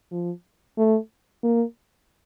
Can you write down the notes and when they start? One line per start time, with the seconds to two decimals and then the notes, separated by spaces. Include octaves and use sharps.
0.12 F3
0.78 A3
1.43 A#3